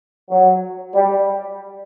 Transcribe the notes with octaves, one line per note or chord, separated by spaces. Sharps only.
F#3
G3